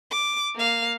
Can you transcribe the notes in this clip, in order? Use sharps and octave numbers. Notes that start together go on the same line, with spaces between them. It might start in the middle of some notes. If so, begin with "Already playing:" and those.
D6
A#3 F5